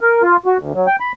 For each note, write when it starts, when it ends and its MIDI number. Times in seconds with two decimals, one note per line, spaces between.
0.01 0.22 70
0.22 0.37 65
0.46 0.58 66
0.58 0.73 38
0.74 0.87 54
0.87 0.96 79
1.00 1.12 83